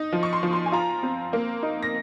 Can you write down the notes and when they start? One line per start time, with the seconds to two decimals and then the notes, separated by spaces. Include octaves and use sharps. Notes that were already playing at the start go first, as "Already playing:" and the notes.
Already playing: D#4
0.13 F3
0.23 C#6
0.33 C6
0.43 F3
0.53 C6
0.66 G#5
0.72 F4 A#5
1.03 C4
1.33 A#3
1.63 D#4
1.83 A#6